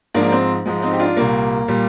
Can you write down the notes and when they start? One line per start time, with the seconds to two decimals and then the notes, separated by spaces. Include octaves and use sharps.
0.14 G#2 F3 G#3 A#3 D4
0.32 C4
0.66 G#2 F3 G#3
0.82 C4 D#4
0.91 G4
0.99 D4 F4
1.17 C2 A#2 G3 A#3
1.68 A#2 G3